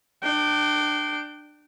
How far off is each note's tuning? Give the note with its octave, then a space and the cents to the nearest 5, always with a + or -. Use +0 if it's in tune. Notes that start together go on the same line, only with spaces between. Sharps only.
D4 +25 G5 -15